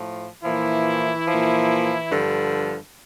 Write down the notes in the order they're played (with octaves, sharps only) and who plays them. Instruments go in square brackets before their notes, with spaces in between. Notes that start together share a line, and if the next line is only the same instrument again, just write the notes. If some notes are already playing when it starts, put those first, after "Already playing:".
Already playing: [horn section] A2 F3
A#2 E3 F3 E4
F3
A#2
G2 D3 F3